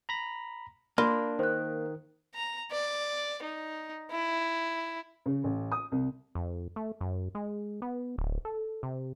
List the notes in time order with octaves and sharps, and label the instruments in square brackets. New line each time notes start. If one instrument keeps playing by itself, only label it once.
[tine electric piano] A#5 B5 A#6
[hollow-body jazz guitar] A#3 [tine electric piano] D4 [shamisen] F4 [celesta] B5
[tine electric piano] D#3 [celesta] C5 F#6
[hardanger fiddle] A#5
D5
D#4
E4
[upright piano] C#3
A1
D#6
C2
[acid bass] F2
A3
F#2
G#3
B3
D1
A4
C3